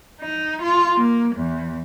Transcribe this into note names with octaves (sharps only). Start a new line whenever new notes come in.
D#4
F4
A#3
E2